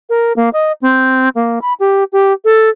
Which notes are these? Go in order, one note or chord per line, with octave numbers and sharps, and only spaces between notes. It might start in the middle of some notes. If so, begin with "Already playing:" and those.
A#4
A#3
D#5
C4
A#3
B5
G4
G4
A4